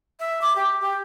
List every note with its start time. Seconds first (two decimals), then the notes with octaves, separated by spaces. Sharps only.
0.20 E5
0.41 D6
0.56 G4
0.81 G4